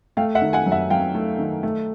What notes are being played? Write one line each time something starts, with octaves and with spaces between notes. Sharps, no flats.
A3 F5 G5
E5 F#5
D#3
F#5 G#5
F#2
E5 F#5
F#3 F5 G5
A3
D#3
A3